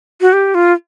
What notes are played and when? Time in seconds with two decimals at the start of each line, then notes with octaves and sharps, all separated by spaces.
0.21 F#4
0.33 G4
0.55 F4